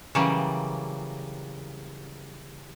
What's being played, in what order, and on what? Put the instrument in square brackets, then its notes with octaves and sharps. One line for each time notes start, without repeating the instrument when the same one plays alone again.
[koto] C#3 E3 F#3 G3 A#3